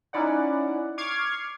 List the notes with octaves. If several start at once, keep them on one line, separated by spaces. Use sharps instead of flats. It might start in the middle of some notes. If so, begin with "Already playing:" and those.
C#4 D#4 E4 D5 F#5
C#6 D6 F6 G#6 C7